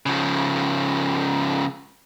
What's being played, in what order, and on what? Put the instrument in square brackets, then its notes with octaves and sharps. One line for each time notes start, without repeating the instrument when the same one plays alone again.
[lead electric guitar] C#3 F3